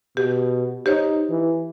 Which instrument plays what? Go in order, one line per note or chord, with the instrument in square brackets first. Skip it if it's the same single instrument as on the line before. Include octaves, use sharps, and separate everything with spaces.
[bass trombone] B2 [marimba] G4
[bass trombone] D#4 [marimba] G4 C5 C#5
[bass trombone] E3